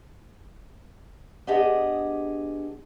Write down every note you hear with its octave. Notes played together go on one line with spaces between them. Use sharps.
B3 D4 G4 G#4 D#5